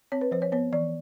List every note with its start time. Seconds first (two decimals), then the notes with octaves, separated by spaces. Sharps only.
0.12 C4 C#5
0.21 B4
0.31 F3 C5
0.42 C#5
0.52 B3 C#5
0.72 E3 D5